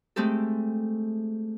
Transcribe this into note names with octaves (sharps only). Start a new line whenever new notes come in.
G#3 A3 C4 G4 A4